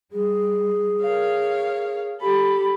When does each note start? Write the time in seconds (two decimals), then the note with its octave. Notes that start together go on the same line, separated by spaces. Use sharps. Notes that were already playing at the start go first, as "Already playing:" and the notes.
0.12 G3 G#4
1.00 A#4 C#5 F5
2.20 G4 A4 B5